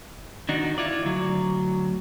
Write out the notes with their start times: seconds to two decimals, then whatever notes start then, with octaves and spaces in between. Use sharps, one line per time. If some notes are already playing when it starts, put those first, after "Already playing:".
0.49 D#3 D4 D#4 F#4
0.78 E4 F4 D5
1.02 D2 F#3